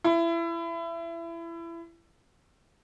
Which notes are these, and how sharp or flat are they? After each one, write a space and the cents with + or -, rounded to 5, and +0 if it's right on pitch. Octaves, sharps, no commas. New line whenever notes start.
E4 +25